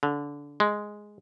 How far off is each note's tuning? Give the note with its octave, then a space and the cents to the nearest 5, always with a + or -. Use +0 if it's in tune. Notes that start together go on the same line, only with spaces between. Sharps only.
D3 -20
G#3 +0